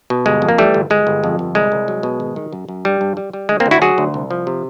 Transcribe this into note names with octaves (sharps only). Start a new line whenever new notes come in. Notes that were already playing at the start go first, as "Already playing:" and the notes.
B2
G1 G#3
F2
A#3
E3 G3 A3
G1
G1 G#3
G1
F2
G1
C2 G#3
C2
F#3
B2
G#1
D#3
F#2
F#2
G2 G3
G2
G3
G3
D2 G#3
A#3 C4
D2
E4 F#4
F#3 F#4 G#4
D2
C2
F3
C3